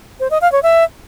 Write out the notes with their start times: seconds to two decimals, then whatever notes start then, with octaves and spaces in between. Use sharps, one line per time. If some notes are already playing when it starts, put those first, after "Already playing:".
0.20 C5
0.31 D#5
0.41 F5
0.52 C#5
0.63 E5